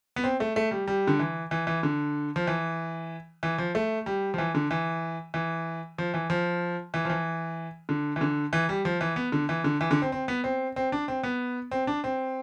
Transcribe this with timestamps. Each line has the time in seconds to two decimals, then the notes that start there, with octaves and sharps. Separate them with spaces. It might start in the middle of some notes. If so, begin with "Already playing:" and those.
0.16 B3
0.24 C4
0.40 A3
0.56 A3
0.71 G3
0.88 G3
1.07 D3
1.19 E3
1.51 E3
1.67 E3
1.83 D3
2.36 F3
2.47 E3
3.43 E3
3.58 F3
3.75 A3
4.06 G3
4.34 F3
4.38 E3
4.55 D3
4.71 E3
5.34 E3
5.98 F3
6.14 E3
6.30 F3
6.94 E3
7.05 F3
7.10 E3
7.89 D3
8.16 E3
8.21 D3
8.53 E3
8.69 G3
8.85 F3
9.01 E3
9.16 B3
9.32 D3
9.49 E3
9.64 D3
9.81 E3
9.91 D3
10.02 C4
10.12 C4
10.28 B3
10.44 C4
10.76 C4
10.92 D4
11.08 C4
11.23 B3
11.71 C4
11.87 D4
12.04 C4